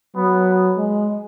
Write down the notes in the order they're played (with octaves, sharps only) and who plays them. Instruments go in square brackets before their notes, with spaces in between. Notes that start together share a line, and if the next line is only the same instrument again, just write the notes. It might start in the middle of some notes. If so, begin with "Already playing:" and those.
[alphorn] F#3 [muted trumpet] B3
[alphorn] G#3